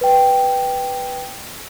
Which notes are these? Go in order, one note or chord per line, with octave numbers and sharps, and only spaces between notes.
B4 G5